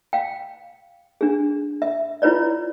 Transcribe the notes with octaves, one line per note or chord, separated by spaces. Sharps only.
F5 G5
D4 G#4
E5
E4 F4 B4 C#5 D5